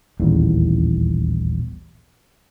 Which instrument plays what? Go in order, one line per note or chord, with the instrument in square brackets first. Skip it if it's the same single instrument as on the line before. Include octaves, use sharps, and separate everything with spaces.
[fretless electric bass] D#1 A1 E2